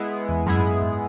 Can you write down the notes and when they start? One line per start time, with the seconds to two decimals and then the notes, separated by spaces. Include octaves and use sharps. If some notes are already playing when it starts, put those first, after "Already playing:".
Already playing: G#3 B3 E4 G#4
0.29 E2
0.46 F#2 G#3 B3 E4 G#4
0.58 G#2
0.64 F#2
0.82 G#2